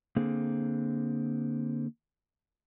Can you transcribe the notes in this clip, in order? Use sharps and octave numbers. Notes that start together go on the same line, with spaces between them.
D3 A#3 C4 G#4